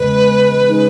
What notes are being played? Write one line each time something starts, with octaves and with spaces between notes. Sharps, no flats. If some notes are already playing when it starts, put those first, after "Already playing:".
Already playing: E2 C#3 G#3 B4
C#3 G#3 D#4